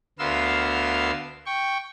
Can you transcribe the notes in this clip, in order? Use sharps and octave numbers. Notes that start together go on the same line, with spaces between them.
D2 B3 A#4 F5 C6 E6
G5 C#6